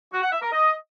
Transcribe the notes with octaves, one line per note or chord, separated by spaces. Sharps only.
F#4
F#5
E5
A#4
D#5